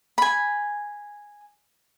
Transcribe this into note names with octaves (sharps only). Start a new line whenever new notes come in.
G#5 B5